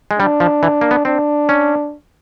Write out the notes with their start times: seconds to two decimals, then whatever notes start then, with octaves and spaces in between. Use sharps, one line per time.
0.11 G#3
0.19 G3 D4
0.40 F3
0.63 E3
0.81 A#3
0.91 B3
1.05 C4 D4
1.49 C#4